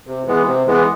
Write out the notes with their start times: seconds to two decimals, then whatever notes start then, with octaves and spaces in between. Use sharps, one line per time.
0.07 C3
0.27 E3 G#3 B3
0.47 C3
0.67 E3 G#3 B3